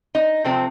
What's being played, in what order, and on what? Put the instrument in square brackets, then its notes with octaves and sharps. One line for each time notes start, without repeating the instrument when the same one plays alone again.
[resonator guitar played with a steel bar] D#4
C3 F3 A3 C4